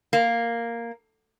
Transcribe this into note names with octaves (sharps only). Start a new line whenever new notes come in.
A#3